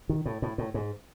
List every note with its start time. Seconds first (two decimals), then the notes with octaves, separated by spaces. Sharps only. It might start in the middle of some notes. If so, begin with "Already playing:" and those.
0.09 D#3
0.26 A2
0.42 A2
0.58 A2
0.74 G#2